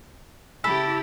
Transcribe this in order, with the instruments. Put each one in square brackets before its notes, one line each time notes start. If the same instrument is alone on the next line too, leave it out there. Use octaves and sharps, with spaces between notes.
[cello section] C#3 E4 G4 [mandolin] A4 B5